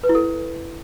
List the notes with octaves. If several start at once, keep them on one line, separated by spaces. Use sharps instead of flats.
B4
E4
A4